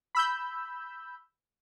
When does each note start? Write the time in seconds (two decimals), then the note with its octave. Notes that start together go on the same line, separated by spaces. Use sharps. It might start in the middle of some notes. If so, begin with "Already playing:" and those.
0.15 B5 E6 G6